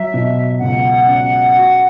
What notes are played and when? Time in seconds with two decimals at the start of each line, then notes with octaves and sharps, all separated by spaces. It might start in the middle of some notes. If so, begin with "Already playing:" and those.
Already playing: F#3 E5
0.14 B2
0.60 C#2 F#5
1.07 C#4
1.54 F#4